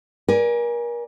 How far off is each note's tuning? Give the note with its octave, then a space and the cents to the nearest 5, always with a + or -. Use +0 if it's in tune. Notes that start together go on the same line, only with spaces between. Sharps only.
A#4 +35 D5 +0 G#5 -5